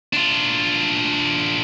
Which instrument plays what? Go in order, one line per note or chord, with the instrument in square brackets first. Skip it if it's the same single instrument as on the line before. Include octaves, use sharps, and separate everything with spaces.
[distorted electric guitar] D4 F4